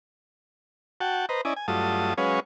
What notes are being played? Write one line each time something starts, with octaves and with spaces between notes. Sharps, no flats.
F#4 F#5 G5 A5
B4 C5 D#5 A#5
C#4 E4 D5 D#5 G#5
G#5
G2 F#3 A3 F4 A5 D#6
F#3 G#3 C#4 B4 C#5 F5